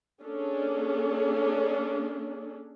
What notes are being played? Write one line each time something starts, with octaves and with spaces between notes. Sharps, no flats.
A#3 C#4 D4 G#4 A4